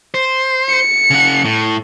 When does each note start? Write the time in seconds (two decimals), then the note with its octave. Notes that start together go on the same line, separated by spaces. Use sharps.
0.14 C5
0.69 C#7
1.10 C#3 F#5
1.45 A2